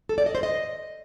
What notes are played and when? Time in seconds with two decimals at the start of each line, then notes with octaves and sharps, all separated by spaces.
0.09 A4
0.18 D5
0.26 D#5
0.35 C5
0.43 D#5